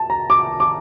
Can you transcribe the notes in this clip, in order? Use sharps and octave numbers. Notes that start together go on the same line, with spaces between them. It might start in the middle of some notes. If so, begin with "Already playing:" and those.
Already playing: A5
A#5
D6
D6